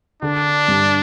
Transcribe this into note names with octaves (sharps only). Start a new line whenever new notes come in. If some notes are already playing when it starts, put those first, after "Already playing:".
D3 D4
G2